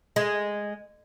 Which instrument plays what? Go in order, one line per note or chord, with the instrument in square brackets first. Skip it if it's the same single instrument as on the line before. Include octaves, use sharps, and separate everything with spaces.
[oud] G#3